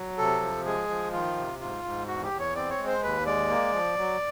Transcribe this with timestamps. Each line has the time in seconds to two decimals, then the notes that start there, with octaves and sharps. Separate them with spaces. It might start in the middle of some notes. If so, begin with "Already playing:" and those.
Already playing: F#3
0.18 C3 A4
0.42 F3
0.65 G#3 G#4
0.89 F3
1.12 D#3 F4
1.37 C3
1.60 G#2 F4
1.84 G#2
2.07 E2 F#4
2.23 G4
2.31 E2
2.40 C#5
2.56 C4 D5
2.70 C#5
2.79 G#3
2.87 C5
3.02 D#2 B4
3.26 G#3 D5
3.50 A#3
3.73 F3
3.97 F#3